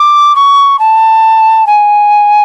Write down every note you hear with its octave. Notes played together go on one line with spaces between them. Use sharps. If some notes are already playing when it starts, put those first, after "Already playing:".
Already playing: D6
C#6
A5
G#5